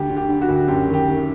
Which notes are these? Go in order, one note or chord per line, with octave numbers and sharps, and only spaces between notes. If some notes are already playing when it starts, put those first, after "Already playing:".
Already playing: D2 G4
D3
G4
D3
F#4
D2
F#2 G4
D#3
G4
D#3